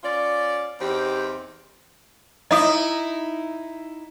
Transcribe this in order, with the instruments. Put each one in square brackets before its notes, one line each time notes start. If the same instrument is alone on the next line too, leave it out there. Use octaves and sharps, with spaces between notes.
[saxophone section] C#4 F4 D5
E2 C4 D#4 G4
[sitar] D#4 E4 [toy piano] D#5 E5 D#6